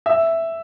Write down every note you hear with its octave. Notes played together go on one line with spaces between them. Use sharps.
E5